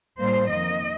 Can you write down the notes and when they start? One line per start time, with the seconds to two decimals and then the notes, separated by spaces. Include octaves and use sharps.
0.20 A2 G3 A#3 C5
0.49 F2 D#3 A#3 D#5